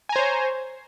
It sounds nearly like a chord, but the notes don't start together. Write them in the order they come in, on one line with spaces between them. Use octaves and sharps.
G#5 A#5 C5 C#5